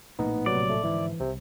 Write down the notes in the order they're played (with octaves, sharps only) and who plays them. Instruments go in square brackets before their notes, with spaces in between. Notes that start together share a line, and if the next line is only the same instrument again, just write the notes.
[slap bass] A#1 A2 A#3 [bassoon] B3 [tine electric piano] D#4
[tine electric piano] C3 F#3 [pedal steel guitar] D5
[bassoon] A3
[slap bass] G#2 D3 F3 [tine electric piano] E3 [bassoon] E4
[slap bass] C2 [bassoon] C3